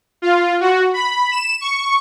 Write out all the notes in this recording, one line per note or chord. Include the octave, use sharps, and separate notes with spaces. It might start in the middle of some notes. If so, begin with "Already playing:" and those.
F4
F#4
B5
E7
C#6